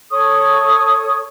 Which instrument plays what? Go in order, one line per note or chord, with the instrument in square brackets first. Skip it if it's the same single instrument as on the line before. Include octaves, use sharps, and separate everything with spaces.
[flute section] A4 C#5 C#6 D#6